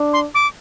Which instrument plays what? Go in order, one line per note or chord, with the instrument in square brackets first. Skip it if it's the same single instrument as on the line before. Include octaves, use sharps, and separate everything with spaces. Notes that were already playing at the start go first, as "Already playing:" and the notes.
Already playing: [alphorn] D4
[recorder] C6
D6